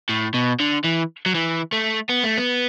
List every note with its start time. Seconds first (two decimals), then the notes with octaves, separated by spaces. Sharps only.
0.09 A2
0.34 B2
0.60 D3
0.84 E3
1.26 F#3
1.35 E3
1.72 A3
2.09 B3
2.23 A3
2.37 B3